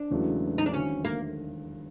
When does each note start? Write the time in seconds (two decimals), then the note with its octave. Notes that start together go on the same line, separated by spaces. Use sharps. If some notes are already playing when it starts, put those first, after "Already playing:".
Already playing: D4
0.10 E1 E2 C#3 F#3 A3
0.58 D#4
0.66 D4
0.73 D#2 D3 F#3 C#4
1.05 A#3